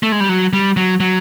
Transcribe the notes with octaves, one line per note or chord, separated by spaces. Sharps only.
A3
G#3
G3
F#3
G3
F#3
F#3